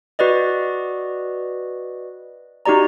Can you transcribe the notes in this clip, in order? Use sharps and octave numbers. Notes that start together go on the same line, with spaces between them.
F#4 B4 D5 D#5
D#4 F#4 G4 D5 A#5